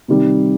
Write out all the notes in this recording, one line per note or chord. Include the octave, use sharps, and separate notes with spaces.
C3 D#3 G3